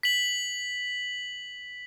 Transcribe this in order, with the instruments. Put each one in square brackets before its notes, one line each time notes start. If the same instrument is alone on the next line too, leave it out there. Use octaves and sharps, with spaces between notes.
[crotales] B6 F#7